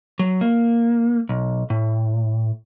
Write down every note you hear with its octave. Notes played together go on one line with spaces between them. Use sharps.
F#3
A#3
B1
A2